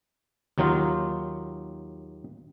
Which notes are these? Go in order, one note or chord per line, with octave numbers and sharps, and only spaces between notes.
D#2 D#3 F#3 D#4 F4